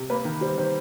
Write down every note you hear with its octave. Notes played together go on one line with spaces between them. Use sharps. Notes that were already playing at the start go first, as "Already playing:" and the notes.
Already playing: C3
A#3 B4
D#3
G3 C5
D#3 C5